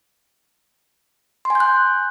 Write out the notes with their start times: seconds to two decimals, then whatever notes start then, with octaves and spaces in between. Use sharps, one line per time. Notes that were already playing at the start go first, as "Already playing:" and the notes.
1.45 C6
1.50 G#5
1.55 G6
1.60 F#6